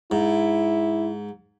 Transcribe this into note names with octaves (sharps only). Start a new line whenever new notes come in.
G#2 E4